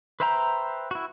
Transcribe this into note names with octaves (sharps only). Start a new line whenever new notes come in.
B4 C5 E5 G5 A#5
E4 F#4